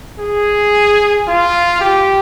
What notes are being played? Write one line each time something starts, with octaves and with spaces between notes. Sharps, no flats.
G#4
F4
G4